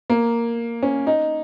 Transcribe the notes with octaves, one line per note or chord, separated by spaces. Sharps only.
A#3
C#4
D#4